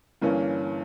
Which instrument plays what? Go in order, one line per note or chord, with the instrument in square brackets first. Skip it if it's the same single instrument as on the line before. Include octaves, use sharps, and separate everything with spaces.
[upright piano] G1 G2 E3 A#3 C#4